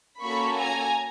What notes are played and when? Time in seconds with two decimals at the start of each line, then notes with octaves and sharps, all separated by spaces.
0.23 A#3 C#4 F#4 A4 B5 C#6
0.57 G#5 A#5